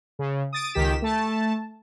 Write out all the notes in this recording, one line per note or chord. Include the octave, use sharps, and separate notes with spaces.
C#3
D#6 A6 D7
C#2 D#3 G4 B6 E7
A3 A5